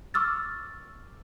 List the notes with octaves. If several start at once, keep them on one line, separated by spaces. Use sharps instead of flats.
C#6 D6 E6 F6 A6